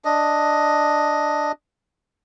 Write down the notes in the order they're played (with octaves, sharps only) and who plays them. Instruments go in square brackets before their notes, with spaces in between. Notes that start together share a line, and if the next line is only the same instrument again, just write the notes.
[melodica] D4 D#5